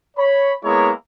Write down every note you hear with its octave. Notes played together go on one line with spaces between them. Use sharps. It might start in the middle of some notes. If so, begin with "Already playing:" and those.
C#5 B5
G#3 A#3 B3 E4 C#5 A#5